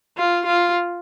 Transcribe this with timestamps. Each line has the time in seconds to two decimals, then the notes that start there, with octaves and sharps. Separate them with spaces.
0.17 F4
0.46 F4